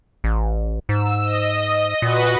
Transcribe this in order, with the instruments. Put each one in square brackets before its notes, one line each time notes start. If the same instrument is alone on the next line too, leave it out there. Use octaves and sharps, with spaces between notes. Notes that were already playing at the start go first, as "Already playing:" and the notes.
[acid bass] A1
[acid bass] G#2 [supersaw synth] E6
[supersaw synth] D#5
[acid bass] A#2 [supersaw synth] F#4 B4 D#5